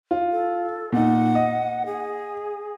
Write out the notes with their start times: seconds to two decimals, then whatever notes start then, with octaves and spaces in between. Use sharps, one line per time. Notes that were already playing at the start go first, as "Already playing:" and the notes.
0.11 F4
0.32 A4
0.92 A#2 D#4 F#5
1.35 D#5
1.86 G#4